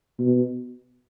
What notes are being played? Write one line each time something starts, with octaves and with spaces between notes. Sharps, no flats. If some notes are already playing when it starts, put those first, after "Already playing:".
B2